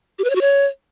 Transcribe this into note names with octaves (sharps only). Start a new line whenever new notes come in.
G4
B4
C#5
F#4
C#5